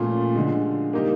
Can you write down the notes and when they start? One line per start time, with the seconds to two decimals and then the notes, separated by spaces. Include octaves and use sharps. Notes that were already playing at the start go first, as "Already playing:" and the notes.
Already playing: A#2 F3 A3 C#4 F4
0.35 D3 F3 G#3
0.93 G3 A#3 D#4 G4